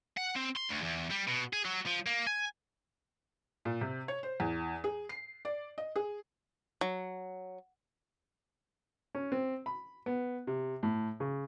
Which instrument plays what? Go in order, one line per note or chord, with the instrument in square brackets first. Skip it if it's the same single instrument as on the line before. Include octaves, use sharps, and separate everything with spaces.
[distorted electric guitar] F#5
C4
C6
D2
E2
G3
B2
G#4
F#3
F3
A#3
G#5
[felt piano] A#2
C3
C#5
C5
E2
G#4
C7
D5
D#5
G#4
[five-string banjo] F#3
[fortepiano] C#4
C4
B5
B3
C3
A2
C#3